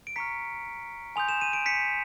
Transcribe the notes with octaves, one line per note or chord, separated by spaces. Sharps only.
D7
A#5 C#6 F6 B6 C#7
G#5 C6 D#6 G6 F7
E7
D#7
D7
B6 C#7